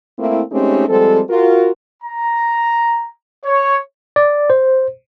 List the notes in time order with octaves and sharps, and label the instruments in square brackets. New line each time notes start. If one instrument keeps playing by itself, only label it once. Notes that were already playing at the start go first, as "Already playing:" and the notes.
[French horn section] A3 A#3 C4 E4
G#3 A3 C4 C#4 D#4 G4
F3 G3 G#3 C4 A4
F4 F#4 A#4
[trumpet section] A#5
C#5
[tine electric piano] D5
C5